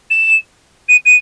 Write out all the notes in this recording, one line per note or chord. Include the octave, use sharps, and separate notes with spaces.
E7
D#7
D#7